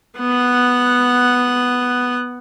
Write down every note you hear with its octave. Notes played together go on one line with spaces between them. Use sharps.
B3 F#5